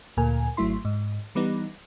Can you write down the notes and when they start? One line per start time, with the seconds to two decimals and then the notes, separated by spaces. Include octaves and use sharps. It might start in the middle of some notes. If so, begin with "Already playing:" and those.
0.17 D2 A#2 A#4 G#5
0.57 G#1 F#3 A3 E4 C6
0.85 G#2
1.35 E3 G3 B3 D#4